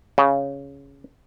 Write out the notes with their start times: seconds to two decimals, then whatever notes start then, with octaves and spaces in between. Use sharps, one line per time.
0.18 C#3